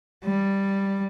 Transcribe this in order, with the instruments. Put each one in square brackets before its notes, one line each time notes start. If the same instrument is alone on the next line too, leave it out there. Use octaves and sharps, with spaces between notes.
[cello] G3